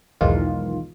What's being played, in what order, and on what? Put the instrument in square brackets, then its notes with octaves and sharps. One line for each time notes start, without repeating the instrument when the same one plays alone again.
[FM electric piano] B1 E2 G#2 D#3 F4